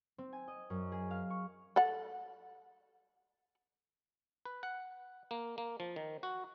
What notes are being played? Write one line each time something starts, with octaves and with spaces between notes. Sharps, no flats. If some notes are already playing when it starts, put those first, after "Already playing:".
C4
G#5
D#5
F#2
G#4
F5
C#6
A4 F#5
B4
F#5
A#3
A#3
F3
D#3
F#4